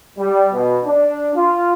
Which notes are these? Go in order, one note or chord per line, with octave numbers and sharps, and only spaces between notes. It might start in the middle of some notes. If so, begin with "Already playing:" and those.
G3
B2
D4
F4